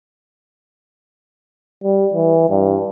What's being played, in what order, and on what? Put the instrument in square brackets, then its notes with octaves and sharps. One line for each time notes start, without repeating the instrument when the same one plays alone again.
[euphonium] G3
E3
G2